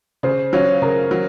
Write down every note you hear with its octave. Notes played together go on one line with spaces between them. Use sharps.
C#3 C5
F#3 C#4 F4 C#5
C#3 A#4
F#3